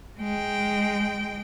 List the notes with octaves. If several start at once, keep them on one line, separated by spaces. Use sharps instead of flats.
G#3 G5